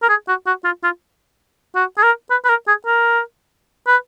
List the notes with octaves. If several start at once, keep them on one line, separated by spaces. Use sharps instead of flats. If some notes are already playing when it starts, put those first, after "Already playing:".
A#4
G#4
F#4
F#4
F4
F4
F#4
G#4
A#4
B4
B4
A#4
G#4
A#4
B4